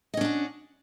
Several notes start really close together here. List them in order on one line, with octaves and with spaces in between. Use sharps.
D#5 C#4 D4 F#4